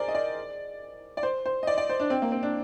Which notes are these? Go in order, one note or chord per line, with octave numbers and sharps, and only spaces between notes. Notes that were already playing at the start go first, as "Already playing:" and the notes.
Already playing: G#4 A#4 C5 D5
D#5
D5
D5
C5
C5
D#5
D5
D5
C5
D4
C4
A#3
C4
D4